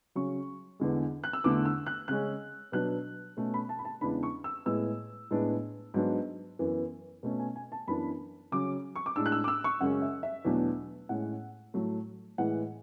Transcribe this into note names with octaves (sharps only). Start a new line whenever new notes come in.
C#3 F#3 C#4 C#6
E2 D3 G#3
F#6
E6
E2 D3 A3 D6
E6
F#6
C#3 G#3 C#4 F#6
B2 F#3 B3 D4 F#6
B2 A3 C#4
B5
A5
B5
A5
E2 C#3 G#3 D4 B5
C#6
E6
A2 G#3 B3 E6
A2 G#3 B3 D4
G#2 F#3 B3 D4
F#2 E3 B3
B2 A3 C#4
G#5
G#5
A5
F#2 E3 B3 D4 B5
C#3 F#3 C#4 D6
C#6
D6
A2 G#3 D4 E6
F#6
E6
D6
E6
C#6
F#2 C#3 G#3 C#4 F#5
E5
E5
E2 B2 F#3 A3 D4
A2 G#3 C#4 F#5
A2 F#3 A3
A2 E3 G#3 F#5